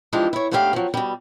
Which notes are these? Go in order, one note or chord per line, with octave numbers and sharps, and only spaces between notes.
E3 F3 G#3 D4 F4 G4
E4 C#5
G#2 A3 B3 D4 G4 F5
F3 F#3
B2 G3